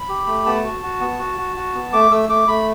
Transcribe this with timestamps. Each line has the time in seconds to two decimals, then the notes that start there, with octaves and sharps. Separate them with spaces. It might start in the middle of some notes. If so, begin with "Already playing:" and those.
Already playing: B5
0.09 G4
0.27 A3
0.46 B3 A5
0.64 F#4
0.83 F#4
1.01 B3
1.19 F#4
1.38 F#4
1.57 F#4
1.74 B3
1.93 A3 D6
2.11 A3 E6
2.29 A3 D6
2.48 A3 B5